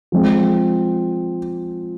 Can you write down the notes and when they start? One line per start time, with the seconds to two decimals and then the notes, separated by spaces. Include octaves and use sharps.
0.12 F3 G#3 C4 G#4